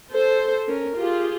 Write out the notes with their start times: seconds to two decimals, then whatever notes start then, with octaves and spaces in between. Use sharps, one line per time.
0.12 A4 C5
0.67 C#4 A#4
0.97 F4 G4 G#4